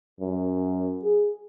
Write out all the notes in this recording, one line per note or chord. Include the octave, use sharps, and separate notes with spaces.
F#2
G#4